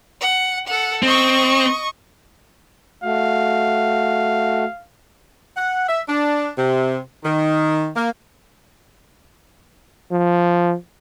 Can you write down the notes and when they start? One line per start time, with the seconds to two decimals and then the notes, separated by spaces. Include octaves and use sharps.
0.21 F#5
0.66 A4 F#5
1.03 C4 D#5 C#6
3.04 A3 F#4 F5
5.55 F#5
5.87 E5
6.08 D4
6.58 C3
7.24 D#3
7.96 A#3
10.11 F3